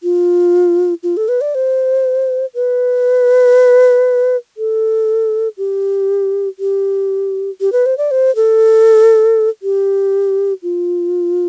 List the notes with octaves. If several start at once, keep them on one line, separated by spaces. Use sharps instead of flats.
F4
F4
A4
B4
D5
C5
B4
A4
G4
G4
G4
B4
C5
D5
C5
A4
G4
F4